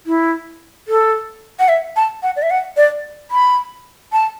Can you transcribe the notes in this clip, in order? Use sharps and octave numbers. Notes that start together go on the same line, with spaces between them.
E4
A4
F#5
E5
A5
F#5
D5
E5
F#5
D5
B5
A5